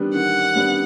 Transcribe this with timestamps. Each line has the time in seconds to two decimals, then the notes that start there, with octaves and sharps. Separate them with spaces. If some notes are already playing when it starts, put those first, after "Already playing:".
Already playing: D#3 G3 B3 D4
0.14 D#3 F#5
0.55 G3 B3 D4